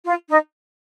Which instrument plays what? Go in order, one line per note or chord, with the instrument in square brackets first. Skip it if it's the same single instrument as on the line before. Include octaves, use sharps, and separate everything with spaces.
[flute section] F4
D#4